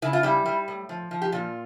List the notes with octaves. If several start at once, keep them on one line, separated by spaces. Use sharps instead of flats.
C#3 E4
F4
G3 E4
G3
A2
F3
F3
G4
A#2 F4